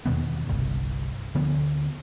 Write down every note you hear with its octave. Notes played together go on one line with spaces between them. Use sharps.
E2 B2 D#3 B3
G1 C2
D2 D3 F3 B3